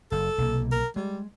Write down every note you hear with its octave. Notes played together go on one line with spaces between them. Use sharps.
F#1 A4
B1 C3 A#3
A#4
G3 G#3